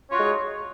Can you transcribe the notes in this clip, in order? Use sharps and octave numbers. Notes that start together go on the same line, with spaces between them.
G#3 D#4 F4 F#4 C#5